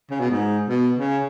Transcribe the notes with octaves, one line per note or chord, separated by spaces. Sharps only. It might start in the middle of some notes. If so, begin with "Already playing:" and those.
C#3
B2
G#2
B2
C#3